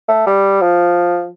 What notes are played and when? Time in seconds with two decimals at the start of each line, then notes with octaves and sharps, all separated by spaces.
0.08 A3
0.26 G3
0.61 F3